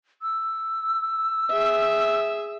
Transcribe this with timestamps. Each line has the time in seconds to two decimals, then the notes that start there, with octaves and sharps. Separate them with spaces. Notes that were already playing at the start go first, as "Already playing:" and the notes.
0.22 E6
1.50 G#4 E5